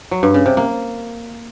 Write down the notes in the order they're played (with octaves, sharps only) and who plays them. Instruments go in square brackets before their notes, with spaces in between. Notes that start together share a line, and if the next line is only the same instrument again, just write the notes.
[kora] F#3
G2
C#3
C3
A#3